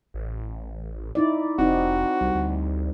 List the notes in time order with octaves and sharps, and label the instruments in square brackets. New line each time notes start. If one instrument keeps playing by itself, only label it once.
[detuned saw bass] A1
[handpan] D#4 E4 D5
[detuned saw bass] F1 [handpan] C4 D#4 [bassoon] F#4
[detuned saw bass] C2 [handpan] G3
[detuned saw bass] D2